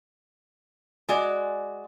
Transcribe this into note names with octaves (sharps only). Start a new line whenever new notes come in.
G#3 F#4 D5